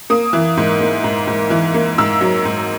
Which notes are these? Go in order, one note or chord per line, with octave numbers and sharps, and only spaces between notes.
A#3 D#6
E3
G#2
A#3
G#2
G#2
E3
A#3
G#2 E6
F#3
G#2